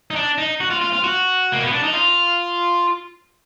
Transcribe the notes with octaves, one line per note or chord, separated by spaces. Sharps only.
D#4
D4
D#4
F#4
F4
F4
F4
F#4
A#3
B3
D4
D#4
F4